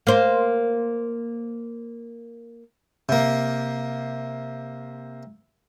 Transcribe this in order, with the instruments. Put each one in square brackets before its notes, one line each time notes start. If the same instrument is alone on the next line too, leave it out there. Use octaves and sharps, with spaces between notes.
[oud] A#3 C5
[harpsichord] C3 A#3